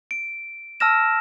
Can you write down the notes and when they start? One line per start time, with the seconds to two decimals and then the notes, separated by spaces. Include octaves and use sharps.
0.11 D7
0.80 A5 E6 F6 A#6 E7